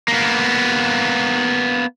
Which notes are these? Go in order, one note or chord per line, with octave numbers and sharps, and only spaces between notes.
A#3 B3